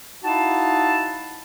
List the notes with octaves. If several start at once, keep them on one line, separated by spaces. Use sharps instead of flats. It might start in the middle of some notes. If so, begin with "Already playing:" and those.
D#4 E4 F#4 F5 A5